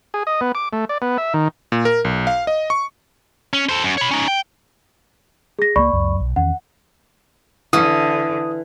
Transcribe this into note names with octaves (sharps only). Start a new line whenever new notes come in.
G#4
D#5
B3
D6
A3
D5
B3
E5
D#3
A#2
A#4
B1
F5
D#5
C#6
C#4
A4 C5
F#2
C#5 B5
C#4 D#4
G5
G#4 A#6
C#2 A3 A#3 D5 B5 C#6
C#2 F#2
B1
E2 D#3 C#4 F#5
D3 E3 E4 D#6